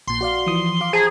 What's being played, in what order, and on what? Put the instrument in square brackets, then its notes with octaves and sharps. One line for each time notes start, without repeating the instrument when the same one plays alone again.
[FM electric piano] A#1 A#2 [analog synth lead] C6
[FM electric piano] F#4 D5 F5
E3 F3 D#6
F4 F5 D6
[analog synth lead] G#4 [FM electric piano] C5 A5 A#5